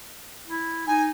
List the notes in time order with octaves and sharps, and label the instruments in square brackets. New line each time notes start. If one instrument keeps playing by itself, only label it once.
[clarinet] E4
[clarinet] D#4 [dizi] G#5